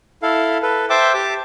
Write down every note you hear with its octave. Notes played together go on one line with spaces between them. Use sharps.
E4 A4 F5
A4 B4
C5 E5 G5 A5 D6
G4 A5 D6